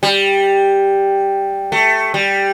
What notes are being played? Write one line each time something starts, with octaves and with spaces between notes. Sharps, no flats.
G3
A3
G3